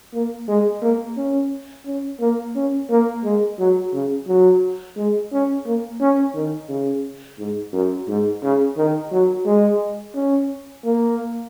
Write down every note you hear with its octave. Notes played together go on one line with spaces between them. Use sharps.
A#3
G#3
A#3
C#4
C#4
A#3
C#4
A#3
G#3
F#3
C#3
F#3
G#3
C#4
A#3
C#4
D#3
C#3
G#2
F#2
G#2
C#3
D#3
F#3
G#3
C#4
A#3